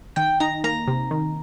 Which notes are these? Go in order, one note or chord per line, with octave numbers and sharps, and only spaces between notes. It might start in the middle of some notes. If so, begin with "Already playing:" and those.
D#3 G5
D#4 A#5
A#3 A#5
C3
D#3